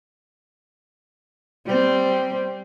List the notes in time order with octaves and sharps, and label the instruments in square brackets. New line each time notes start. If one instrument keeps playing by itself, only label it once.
[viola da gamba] G3 C4